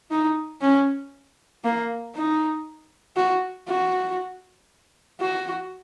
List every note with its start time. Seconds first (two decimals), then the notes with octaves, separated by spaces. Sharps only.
0.11 D#4
0.62 C#4
1.64 A#3
2.15 D#4
3.16 F#4
3.68 F#4
5.21 F#4